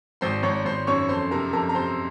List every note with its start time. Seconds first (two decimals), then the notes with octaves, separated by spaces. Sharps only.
0.21 G#1 C5 C6
0.43 G#1 C#5 C#6
0.65 G#1 C5 C6
0.87 F#2 C#5 C#6
1.09 F2 C5 C6
1.31 C3 A#4 A#5
1.53 F2 A#4 A#5
1.69 A#5
1.75 C3 C5 C6